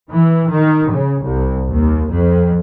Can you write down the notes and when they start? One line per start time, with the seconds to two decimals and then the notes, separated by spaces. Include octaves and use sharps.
0.10 E3
0.50 D#3
0.90 C#3
1.22 C2
1.70 D#2
2.12 F2